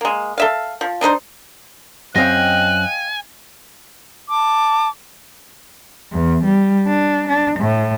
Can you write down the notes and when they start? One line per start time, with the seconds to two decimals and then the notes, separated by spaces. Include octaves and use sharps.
0.01 G#3 A#3
0.38 A4 E5 F5
0.81 F3
1.01 D4 D#4 A#4 C5
2.16 F#2 C4 D#5 F5 G5 G#5 F#6
4.31 A5 D6
6.12 E2
6.45 G3
6.87 D4
7.28 D4
7.60 A2